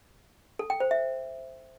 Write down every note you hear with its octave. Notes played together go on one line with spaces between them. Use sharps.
A4
G5
C5
E5